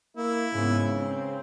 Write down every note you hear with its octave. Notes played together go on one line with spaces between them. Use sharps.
A#3 E4
G#2 C#3 B3
C4